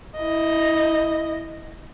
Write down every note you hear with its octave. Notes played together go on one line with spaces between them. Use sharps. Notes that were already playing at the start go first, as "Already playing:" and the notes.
E4 D#5